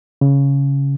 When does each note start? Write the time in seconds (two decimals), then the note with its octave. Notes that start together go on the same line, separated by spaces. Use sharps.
0.21 C#3